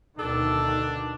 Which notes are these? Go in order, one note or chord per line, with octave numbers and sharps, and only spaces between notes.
D2 B2 D#3 D4 A4